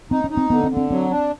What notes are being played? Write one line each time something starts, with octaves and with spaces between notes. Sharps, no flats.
C4 D#4
C#4
D#4
C4
D3 B3
C4
D3
C4
F#3 C4
D4